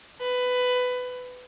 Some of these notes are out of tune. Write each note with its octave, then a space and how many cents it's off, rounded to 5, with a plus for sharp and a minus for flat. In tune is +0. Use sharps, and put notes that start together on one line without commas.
B4 +15